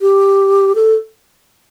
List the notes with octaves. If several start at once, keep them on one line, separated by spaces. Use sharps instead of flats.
G4
A4